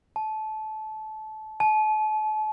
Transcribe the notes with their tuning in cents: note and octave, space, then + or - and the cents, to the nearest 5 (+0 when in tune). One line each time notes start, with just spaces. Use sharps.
A5 -25
A5 -40